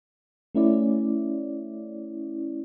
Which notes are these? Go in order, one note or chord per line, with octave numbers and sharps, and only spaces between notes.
A3 C#4 E4 D5